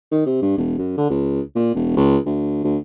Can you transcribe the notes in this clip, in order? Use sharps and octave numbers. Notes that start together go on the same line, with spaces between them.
D#3
C3
G2
E1
F#2
D3
C#2
A#2
E1
C#2
D2
D2